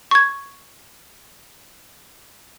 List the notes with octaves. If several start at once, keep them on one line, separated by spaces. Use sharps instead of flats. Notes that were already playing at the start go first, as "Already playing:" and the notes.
C#6 G#6